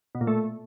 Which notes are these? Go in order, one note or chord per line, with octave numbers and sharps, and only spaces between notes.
B2
A#2
A3